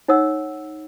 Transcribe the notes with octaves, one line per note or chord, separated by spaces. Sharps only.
D#4 C#5 F#5 E6